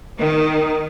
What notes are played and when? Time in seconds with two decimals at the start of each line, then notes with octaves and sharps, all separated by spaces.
0.17 D#3